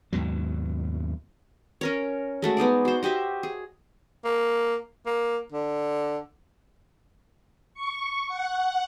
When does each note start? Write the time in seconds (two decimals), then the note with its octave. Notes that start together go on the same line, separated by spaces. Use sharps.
0.13 D#2 G#2 B2 F#3
1.81 C#4 A#4 C#5
2.42 G#3 A3 F#4
2.57 B3 D#4 G#4 D5
2.85 F#4 C5
3.03 F#4 G4 D#5 E5
3.43 G#4
4.25 A#3
5.06 A#3
5.52 D3
7.74 C#6
8.28 F#5